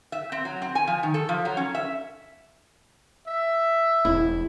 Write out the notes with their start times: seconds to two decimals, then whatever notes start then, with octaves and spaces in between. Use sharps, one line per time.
0.12 E5
0.32 C4
0.45 F#3
0.62 C4
0.75 G#5
0.87 F3
1.03 D#3
1.14 A4
1.29 F3
1.45 F#3
1.57 C#4
1.75 E5
3.28 E5
4.05 E1 E4